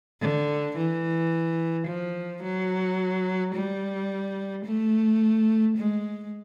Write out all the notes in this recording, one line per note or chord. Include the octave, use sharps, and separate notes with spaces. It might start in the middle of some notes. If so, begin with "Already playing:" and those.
D3
E3
F3
F#3
G3
A3
G#3